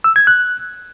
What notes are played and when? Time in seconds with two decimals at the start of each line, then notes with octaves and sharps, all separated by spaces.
0.04 E6
0.16 G#6
0.27 F#6